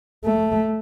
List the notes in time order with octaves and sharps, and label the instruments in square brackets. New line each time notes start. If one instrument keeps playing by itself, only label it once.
[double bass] A3